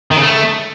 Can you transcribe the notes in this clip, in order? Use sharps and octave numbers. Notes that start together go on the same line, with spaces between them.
D#3
C#3
A3